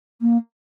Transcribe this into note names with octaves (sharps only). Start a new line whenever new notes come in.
A#3